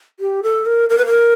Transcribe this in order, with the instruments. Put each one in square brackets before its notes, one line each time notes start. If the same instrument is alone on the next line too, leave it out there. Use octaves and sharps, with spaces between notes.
[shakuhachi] G4
A4
A#4
A#4
B4
A#4